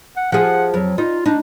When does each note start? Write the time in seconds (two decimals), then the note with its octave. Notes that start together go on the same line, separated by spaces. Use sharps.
0.17 F#5
0.32 F3 G#4 F#5
0.74 F2 F#3
0.98 D#4 F4
1.26 D4 D#4